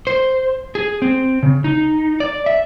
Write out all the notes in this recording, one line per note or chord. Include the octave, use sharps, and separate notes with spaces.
C5
G#4
C4
C#3
D#4
D5
E5